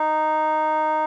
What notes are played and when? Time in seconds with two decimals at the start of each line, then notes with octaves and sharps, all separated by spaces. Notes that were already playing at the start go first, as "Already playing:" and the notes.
Already playing: D#4